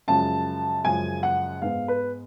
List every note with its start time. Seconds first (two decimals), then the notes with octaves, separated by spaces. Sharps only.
0.08 F#2 C#3 F3 G#3 A5
0.84 F#2 C#3 F3 G#3 G#5
1.23 F#5
1.62 G#2 G#3 B3 F5
1.88 B4